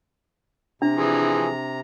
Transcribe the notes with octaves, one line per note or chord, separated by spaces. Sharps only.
C3 D4 A#5
E3 F3 G#4